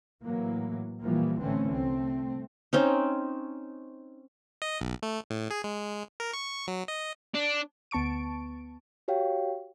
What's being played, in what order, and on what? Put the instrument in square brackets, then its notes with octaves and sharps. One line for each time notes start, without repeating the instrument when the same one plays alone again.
[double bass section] A2 E3 F#3 A#3
A#2 E3 F3 G3 A#3
A1 D3 E3 A3 C4 C#4
C2 A3 C4
[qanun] C4 C#4 D#4
[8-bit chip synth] D#5
B1
A3
A2
G#4
G#3
A#4
C#6
F#3
D#5
[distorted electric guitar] D4
[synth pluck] D2 B3 A5 C#6 D7
[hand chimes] F#4 G4 C#5 F5 G5